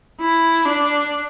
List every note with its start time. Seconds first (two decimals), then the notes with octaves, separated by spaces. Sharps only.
0.20 E4
0.65 D4